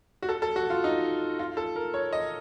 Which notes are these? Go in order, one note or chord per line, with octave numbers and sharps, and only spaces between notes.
F#4
A4
A4
F#4
F4
D#4
F4
A4
A#4
C#5
D#5